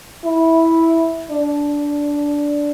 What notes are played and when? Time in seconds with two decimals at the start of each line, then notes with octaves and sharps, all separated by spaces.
0.24 E4
1.31 D4